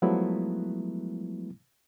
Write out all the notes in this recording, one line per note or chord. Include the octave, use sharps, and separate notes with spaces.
F3 F#3 G#3 A3 B3 E4